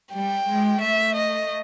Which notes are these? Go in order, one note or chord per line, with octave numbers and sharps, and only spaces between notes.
G3 G5
G#3
A3 E5
D#5